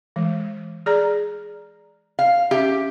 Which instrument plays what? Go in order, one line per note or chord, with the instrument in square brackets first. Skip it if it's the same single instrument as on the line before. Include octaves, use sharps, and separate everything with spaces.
[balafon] E3 G#3
G#4 D5 A#5
[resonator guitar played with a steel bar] F5
[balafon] C#4 E5 [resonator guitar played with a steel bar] G4